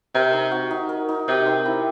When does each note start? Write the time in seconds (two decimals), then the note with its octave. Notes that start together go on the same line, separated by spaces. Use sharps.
0.14 C3 A#4
0.33 D#4
0.51 F#4
0.71 D#4
0.89 A#4
1.09 D#4
1.28 C3 G4
1.46 C4
1.66 E4